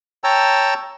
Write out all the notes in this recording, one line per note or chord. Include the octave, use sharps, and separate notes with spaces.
C#5 G5 A5 A#5 E6